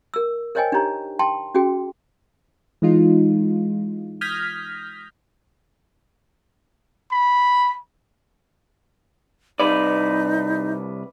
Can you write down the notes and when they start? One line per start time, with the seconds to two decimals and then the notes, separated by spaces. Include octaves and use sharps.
0.14 A#4 E6
0.55 A#4 C5 C#5 D#5 G5 G#5
0.72 D4 D#4 G4 C#5 A#5
1.19 G5 A5 C6
1.54 C#4 F#4 G#4 G5
2.82 E3 G#3 D#4 F4
4.21 D#6 F6 G6 G#6 A#6 B6
7.12 B5
9.60 C2 D#4 B4 D5